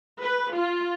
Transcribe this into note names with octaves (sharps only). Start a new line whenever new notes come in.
B4
F4